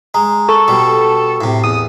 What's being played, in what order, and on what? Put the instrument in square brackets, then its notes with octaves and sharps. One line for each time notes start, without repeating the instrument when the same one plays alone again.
[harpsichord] G#3 [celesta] A#5
[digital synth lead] A4 [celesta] C#6
[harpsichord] B2 G3
A2 C3
[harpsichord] E2 [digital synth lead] D#6